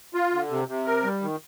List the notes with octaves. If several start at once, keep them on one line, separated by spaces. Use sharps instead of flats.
F4
D3
C3
C3
A#4
G3
D#3